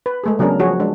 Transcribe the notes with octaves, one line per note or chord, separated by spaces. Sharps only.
B4
G#3 A3 G#4
C#3 F#3 B3 D4 G#4 A#4
F3 F#4 G#4 C#5
G#3 D4